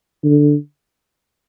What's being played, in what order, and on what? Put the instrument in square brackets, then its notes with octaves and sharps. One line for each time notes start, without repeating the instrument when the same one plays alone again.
[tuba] D3